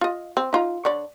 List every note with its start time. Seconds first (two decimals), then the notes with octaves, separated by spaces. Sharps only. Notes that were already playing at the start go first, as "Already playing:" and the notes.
0.01 F4 D#5
0.37 C4
0.53 D#4 F4 A#5
0.85 D3 C#5 D5